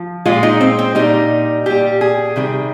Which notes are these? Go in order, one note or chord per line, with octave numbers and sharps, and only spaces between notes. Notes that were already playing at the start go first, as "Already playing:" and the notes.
Already playing: F3
A#2 G#3 F4
D#4
C4
C4
A#2 G3 D#4
A#2 G3 G4
G#4
C3 D#3 G3